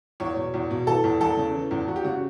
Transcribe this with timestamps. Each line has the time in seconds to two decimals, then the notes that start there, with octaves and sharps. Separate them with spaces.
0.20 E2 C#5
0.37 B2
0.54 E2
0.71 B2
0.87 E3 A4
1.04 E2
1.21 E2 A4
1.37 C#3
1.54 E3
1.71 E2
1.88 E2 F#4
1.96 G4
2.04 C#3 F#4